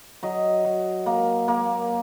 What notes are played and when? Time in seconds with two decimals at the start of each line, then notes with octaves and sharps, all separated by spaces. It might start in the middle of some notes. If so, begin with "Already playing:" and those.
0.23 F#3 D#5
0.64 F#3
1.06 A#3
1.48 A#3